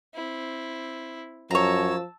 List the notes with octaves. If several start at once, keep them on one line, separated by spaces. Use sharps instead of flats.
C4 E4
F#2 F3 C#5 A5 A#5 E6